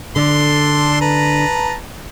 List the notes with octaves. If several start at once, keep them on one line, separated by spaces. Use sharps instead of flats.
D3 D4 A4 C6
B4 A5 A#5